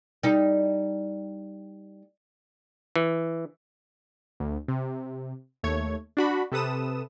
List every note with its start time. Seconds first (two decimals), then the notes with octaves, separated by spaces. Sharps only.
0.23 G3 D#4
2.96 E3
4.40 D2
4.68 C3
5.63 D#2 A3 C#5 G#6
6.17 D4 F#4 B5
6.52 C3 A4 B4 D#6 E7